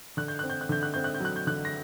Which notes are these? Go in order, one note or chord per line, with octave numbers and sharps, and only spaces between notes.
D3 F#6
G6
C4 F#6
G6
F#6
D3 G6
F#6
C4 G6
F#6
G6
F#3 F#6
G6
D3 F#6
A#6